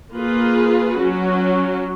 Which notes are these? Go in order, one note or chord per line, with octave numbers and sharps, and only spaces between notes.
A#3 F4 G#4 B4
F#3 C#4 F#4